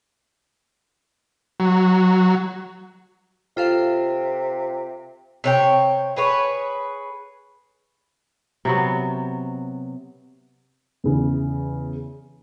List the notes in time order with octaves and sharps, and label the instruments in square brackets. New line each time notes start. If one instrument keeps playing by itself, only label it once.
[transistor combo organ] F#3
[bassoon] C3 [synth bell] F4 A4 F5
[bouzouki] C3 C#5 G5
G#4 B4 C#5
[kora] C3 F#3 B3
[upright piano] E2 C#3 E3